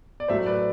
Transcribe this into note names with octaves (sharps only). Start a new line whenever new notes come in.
D5
A2 F#3 A3 C5 E5
B4 D5